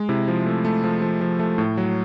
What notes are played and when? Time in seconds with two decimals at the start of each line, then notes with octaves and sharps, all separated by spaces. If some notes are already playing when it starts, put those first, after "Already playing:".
Already playing: G#3
0.09 C3 E4
0.28 F3
0.46 A3
0.65 A3
0.84 F3
1.02 F3
1.21 F3
1.40 A3
1.58 A2
1.77 F#3